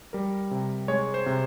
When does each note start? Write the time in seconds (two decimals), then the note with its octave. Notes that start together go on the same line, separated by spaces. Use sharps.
0.13 G3 A#4
0.51 C3
0.88 G#3 C#5
1.14 C5
1.26 C3